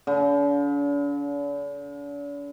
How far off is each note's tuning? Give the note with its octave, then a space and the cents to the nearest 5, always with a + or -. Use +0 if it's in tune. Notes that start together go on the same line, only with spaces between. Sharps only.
D3 -45